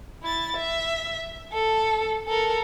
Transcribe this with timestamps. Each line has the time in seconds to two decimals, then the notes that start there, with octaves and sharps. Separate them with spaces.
0.23 E4 A6
0.57 E5
1.53 A4
2.28 A4 A#4